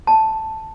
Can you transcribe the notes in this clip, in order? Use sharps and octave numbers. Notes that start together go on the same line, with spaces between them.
A5